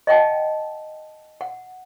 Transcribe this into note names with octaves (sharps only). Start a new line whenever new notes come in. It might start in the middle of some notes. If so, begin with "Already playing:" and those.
D#5 E5 F#5 G5 A5
F#5